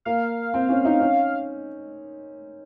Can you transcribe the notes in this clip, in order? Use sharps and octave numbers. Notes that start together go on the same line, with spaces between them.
A#3 F5
C4
C#4
D#4
C#4